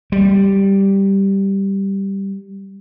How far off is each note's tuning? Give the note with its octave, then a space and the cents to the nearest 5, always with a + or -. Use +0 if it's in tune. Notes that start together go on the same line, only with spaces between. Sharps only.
G3 +0